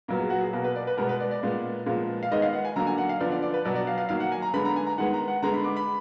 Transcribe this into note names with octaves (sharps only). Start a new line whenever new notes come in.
A#2 F#3 B3 A#4
G#4
F#4
G#4
B2 A#3 A#4
B4
D5
B4
B2 G#3 B3 A#4
B4
D5
D5
A#2 G#3 B3
A#2 F3 G#3 B3
F5
D#3 G#3 B3 D#5
F5
F#5
G#5
D3 F#3 A#3 A#5
G#5
F#5
F5
D3 F3 B3 D5
D5
D5
B4
B2 F#3 B3 D5
D5
F5
F5
D#3 F#3 A#3 F5
F#5
G#5
A#5
D3 G#3 B3 B5
A#5
G#5
A#5
D#3 G#3 B3 F#5
A#5
F#5
D3 G#3 B3 A#5
B5
D6
B5